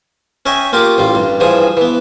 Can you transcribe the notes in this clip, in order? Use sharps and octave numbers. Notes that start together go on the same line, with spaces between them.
C#4 C#5 D#5 E5 G5 G#5
A#3 F4 G4 A#4 D6 D#6
A1 G3 F4
G2
G2 E3 F3 G#4 D#6
E3 B3